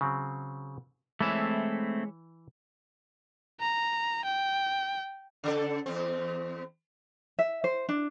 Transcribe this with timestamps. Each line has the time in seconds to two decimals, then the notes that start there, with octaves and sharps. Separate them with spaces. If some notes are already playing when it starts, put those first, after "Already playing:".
0.01 C#3 F#3 C4
1.21 E3 G#3 A3 C4 E4 C#5 E5
3.61 A#5
4.25 G5
5.44 C#3 A4
5.86 E2 C4
7.39 E5
7.64 C5
7.89 D4